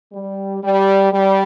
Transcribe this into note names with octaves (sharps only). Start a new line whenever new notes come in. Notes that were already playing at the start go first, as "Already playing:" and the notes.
G3
G3
G3